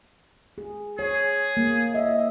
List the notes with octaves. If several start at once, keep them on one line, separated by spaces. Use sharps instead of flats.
G#4
G#4 C#5
A#3
D#5 E5